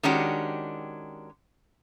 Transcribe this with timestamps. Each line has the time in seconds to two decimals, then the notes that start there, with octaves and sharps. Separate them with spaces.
0.03 D#3 G#3 C#4 D4 F#4 G4